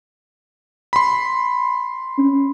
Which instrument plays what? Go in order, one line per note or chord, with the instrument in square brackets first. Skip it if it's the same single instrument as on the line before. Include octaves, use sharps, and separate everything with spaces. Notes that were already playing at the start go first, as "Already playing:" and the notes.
[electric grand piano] B5 C6
[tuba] C#4